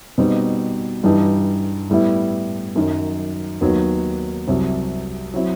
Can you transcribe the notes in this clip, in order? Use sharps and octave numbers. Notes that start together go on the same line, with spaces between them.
B2 G3 C4 D#4
G2 E3 G3 D#4
A2 G3 B3 E4
F#2 D#3 F#3
D#2 D#3 F#3 B3
C2 C3 F#3
F#3 C4 E4